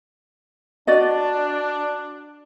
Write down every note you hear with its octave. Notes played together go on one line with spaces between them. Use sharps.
D4 F#4 D5 D#5